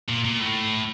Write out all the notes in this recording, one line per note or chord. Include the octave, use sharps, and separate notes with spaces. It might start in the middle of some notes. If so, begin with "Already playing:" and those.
A#2
A#2
A2